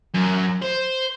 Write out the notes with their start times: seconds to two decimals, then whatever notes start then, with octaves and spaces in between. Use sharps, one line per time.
0.15 F#2
0.62 C5